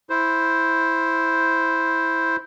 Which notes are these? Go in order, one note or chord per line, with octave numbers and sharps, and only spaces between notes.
E4 C5